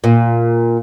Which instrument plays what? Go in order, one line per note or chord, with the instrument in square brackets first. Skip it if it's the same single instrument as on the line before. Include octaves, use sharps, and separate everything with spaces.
[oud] A#2